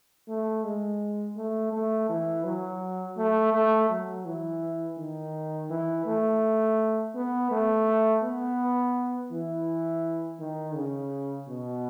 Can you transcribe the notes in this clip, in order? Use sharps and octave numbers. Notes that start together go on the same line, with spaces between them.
A3
G#3
A3
A3
E3
F#3
A3
A3
F#3
E3
D#3
E3
A3
B3
A3
B3
E3
D#3
C#3
B2